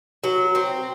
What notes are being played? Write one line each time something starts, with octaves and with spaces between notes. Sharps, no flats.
F#3
C4